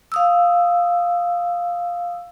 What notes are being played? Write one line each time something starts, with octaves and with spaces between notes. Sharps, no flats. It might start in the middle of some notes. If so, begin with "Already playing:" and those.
F5 D#6 E6